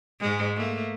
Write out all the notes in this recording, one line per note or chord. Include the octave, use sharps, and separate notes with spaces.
G#2 G#3
A3 A#3